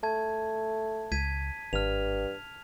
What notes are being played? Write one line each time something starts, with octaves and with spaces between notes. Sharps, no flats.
A3 A5 G#6
C#2 G#6 B6 D#7
G#1 G2 F6 F7